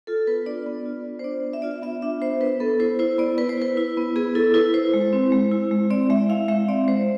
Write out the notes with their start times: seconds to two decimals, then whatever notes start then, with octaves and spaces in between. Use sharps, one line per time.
0.07 F4 A4
0.27 B3 B4
0.46 D4 D5
0.66 B3
0.85 F4
1.04 B3
1.19 C5
1.24 D4 D5
1.43 B3
1.53 E5
1.62 F4 D5
1.71 E5
1.83 B3 E5
2.02 D4 E5
2.21 B3 C5
2.41 B3 B4
2.60 B3 A4
2.80 E4 C5
2.99 E4 C5
3.18 B3 D5
3.38 B3 B4
3.49 C5
3.58 E4 B4
3.77 E4
3.97 B3
4.16 B3 G#4
4.35 E4 A4
4.54 E4 B4
4.74 E4 C5
4.94 G#3
5.13 C4
5.32 G#3
5.52 E4
5.71 G#3
5.90 C4 D5
6.10 G#3 E5
6.29 E4 F5
6.49 G#3 E5
6.69 C4 D5
6.88 G#3 C5